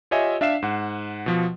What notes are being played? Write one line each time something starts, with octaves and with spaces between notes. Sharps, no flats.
F4 G4 C#5 D#5 E5 G#5
D4 E5 F5 C7 E7
G#2 F#5
B2 F3